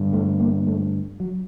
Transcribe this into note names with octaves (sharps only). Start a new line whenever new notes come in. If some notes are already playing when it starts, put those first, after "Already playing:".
Already playing: G2 D3
A3
A#3
A3
F#3